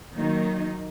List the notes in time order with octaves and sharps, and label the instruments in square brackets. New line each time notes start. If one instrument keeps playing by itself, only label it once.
[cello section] D#3 F#3 A#3 D#4